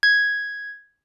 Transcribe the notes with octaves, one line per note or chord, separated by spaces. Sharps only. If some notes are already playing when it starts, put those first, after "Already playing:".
G#6